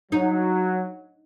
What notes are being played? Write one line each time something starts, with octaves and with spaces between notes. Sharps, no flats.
F#3 D#4